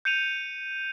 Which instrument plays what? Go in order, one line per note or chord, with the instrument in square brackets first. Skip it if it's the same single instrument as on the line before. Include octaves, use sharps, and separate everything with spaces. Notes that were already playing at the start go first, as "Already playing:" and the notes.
[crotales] G6 C#7 D#7 F7